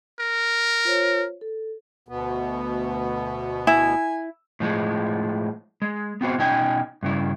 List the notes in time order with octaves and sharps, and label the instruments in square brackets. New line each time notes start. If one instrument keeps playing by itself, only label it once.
[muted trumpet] A#4
[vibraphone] F4 C5 C#5
A4
[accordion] D2 B2 B3
[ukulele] E4 [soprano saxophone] G#5
[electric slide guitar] A2 F3 G#3
G#3
B3 C4 F#4 C5
B2 C#4 D#4 G5 G#5
G2 C#3 E4